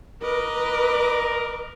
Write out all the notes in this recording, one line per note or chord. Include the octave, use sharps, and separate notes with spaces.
A#4 B4 D#5 D6